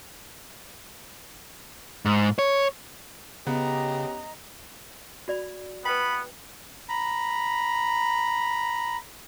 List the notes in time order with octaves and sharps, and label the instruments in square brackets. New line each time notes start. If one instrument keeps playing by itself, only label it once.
[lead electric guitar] G#2
C#5
[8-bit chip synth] C#3 [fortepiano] B3 [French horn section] C#4 G4 [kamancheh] D#5 A#5
[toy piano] F#4 D5 B5
[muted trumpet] B3 [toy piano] B4 G5 [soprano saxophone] B5
[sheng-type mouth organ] A#5 B5